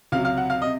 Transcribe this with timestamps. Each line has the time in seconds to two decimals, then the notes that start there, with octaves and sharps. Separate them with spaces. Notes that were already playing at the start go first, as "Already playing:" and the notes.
0.12 C#2 C3 F#3 F5
0.25 F5
0.37 F#5
0.50 F5
0.62 C3 D#5